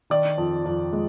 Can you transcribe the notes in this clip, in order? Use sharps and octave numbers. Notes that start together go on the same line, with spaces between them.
D#3 D5
F2
F2
G#3